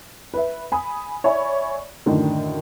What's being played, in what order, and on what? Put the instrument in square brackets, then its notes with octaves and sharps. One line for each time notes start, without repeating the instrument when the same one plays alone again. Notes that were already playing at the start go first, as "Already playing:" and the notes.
[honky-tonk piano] B4 E5
G#5 B5 D#6
C#5 D5 E5 G#5 B5
F#2 A2 D3 D#3